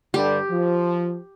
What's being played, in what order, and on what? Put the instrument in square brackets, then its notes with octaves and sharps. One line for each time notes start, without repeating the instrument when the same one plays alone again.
[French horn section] G2 D3 G3 [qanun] G4
[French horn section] F3